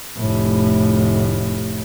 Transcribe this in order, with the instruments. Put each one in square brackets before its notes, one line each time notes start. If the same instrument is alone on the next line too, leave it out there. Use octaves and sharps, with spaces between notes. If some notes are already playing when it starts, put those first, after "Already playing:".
[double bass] F1 A2